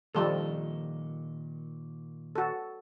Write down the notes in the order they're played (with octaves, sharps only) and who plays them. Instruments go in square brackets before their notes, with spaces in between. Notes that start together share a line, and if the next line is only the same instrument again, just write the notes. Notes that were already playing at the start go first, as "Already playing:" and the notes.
[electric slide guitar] A#2 D#3 D#5 [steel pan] F3 G3 A4
[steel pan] F#4 A4